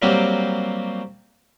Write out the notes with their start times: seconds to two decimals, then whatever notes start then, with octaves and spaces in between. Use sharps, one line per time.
0.02 F#3 G3 A#3 C4 F#4 G4